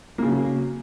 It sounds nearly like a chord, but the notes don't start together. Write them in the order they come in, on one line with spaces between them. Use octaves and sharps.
A#3 C#3 F#3